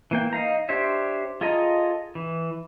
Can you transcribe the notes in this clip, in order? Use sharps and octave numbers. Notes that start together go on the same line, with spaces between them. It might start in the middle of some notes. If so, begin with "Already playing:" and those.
E3 A#3 G5
D#4 F5 A#5
D4 G4 C5 C#5 E5
F4 G#4 A4 D#5 A#5
E3